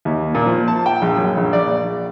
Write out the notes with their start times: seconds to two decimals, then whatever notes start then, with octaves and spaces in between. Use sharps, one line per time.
0.05 D#2
0.35 A#2
0.46 F3
0.68 A5
0.86 G5
1.02 A#1
1.16 F#2
1.37 A#1
1.53 D5
1.67 A#1